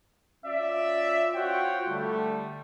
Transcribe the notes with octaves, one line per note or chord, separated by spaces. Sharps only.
C#4 F4 D5 E5
F4 F#4 C5 C#5 F#5 G5
D3 G3 A3